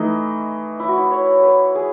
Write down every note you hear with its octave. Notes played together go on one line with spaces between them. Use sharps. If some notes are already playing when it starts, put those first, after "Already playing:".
Already playing: E3 A3 D#4 D#5
E4
F#4
E4
C#5
B4
G#4